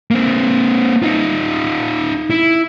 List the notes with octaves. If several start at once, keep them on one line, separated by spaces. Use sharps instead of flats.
A#3 C4
D#4 F4
E4